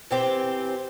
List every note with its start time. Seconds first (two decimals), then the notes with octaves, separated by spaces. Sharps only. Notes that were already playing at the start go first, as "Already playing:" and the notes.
0.11 E3 C4 G4